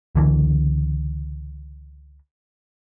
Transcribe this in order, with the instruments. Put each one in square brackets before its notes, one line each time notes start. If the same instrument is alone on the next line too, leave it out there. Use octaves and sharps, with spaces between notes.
[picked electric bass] C#2 D3 E3